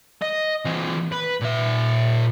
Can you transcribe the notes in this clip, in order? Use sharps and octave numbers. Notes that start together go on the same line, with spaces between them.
D#5
E3 C4
B4
A#2 E5